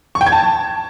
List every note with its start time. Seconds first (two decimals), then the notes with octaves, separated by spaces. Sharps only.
0.15 C#6
0.21 G5
0.27 G#6
0.32 A5